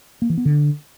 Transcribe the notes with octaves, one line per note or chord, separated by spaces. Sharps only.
A#3
E3
B3
D3